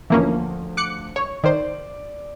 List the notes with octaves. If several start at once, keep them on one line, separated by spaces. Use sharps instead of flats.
D2 E3 F3 A#3 C#4
D6 F#6 C#7
C#5 C#6
D#3 C5 D5